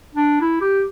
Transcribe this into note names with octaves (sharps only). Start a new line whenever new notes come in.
D4
E4
G4